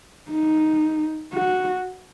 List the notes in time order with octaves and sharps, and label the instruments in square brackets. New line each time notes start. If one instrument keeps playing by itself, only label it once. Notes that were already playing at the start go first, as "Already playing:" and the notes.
[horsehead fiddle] D#4
F#4